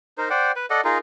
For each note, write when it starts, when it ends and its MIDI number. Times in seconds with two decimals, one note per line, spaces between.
0.18 0.29 63
0.18 0.29 70
0.18 0.29 72
0.30 0.52 72
0.30 0.52 74
0.30 0.52 78
0.30 0.52 79
0.56 0.66 71
0.70 0.81 69
0.70 0.81 74
0.70 0.81 75
0.70 0.81 78
0.84 0.98 63
0.84 0.98 65
0.84 0.98 68
0.84 0.98 70